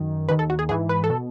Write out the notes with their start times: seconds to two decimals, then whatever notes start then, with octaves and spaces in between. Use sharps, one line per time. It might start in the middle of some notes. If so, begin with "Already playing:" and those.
Already playing: F#2 D#3
0.29 D#2 D#3 B4
0.39 A4
0.50 F#4
0.59 G#4
0.69 G#2 E3 G#4
0.89 B4
1.04 A4
1.10 B2